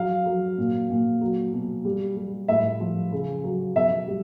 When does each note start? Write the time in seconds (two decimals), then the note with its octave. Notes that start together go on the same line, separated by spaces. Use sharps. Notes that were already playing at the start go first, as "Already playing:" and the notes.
Already playing: F#3 F5
0.26 F#3
0.58 A#2
0.90 A#2
1.21 F#3
1.53 B2
1.85 G3
2.17 G3
2.48 A2 E5
2.80 F3
3.12 C#3
3.44 F#3
3.76 B2 E5
4.07 G3